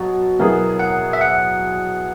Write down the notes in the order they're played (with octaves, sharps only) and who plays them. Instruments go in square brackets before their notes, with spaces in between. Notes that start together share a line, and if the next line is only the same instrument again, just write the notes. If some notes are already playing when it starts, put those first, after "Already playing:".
Already playing: [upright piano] B2 F#3 [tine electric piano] F#4
[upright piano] B2 F#3 B3 E4 G#4 [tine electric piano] A#4
[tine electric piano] F#5
E5
F#5